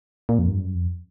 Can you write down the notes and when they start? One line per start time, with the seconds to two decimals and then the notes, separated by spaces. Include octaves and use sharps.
0.29 A#2
0.39 F2
0.49 G2
0.60 F#2
0.75 F2